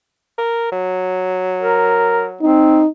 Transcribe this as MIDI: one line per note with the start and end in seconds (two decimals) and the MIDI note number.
0.38 0.69 70
0.72 2.46 54
1.61 2.26 70
2.41 2.81 60
2.41 2.86 63